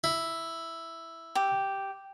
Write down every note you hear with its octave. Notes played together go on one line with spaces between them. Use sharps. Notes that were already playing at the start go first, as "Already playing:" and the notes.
E4
G4